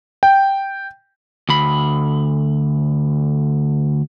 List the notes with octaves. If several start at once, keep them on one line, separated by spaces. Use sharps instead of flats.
G5
D2 B5